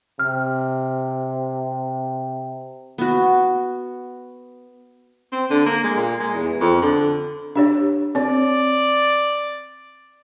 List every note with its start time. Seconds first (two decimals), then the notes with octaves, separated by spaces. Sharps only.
0.19 C3 F6
2.98 B3 F#4
5.32 C4
5.50 D3
5.66 A#3
5.84 G#3
5.96 A#2
6.20 G#3
6.33 E2
6.61 F2
6.82 D3
7.56 D4 G4 C#5
8.15 C4 C#5 D5